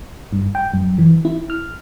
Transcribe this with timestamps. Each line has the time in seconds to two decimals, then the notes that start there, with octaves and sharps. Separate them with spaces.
0.33 G2
0.55 G5
0.74 F#2
0.98 E3
1.25 E4
1.50 F6